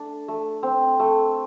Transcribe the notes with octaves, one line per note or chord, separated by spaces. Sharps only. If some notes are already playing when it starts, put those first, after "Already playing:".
Already playing: A3 D4
A3
C4
A3